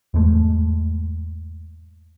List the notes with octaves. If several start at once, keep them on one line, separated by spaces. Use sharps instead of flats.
E2 G#2 G#3 A3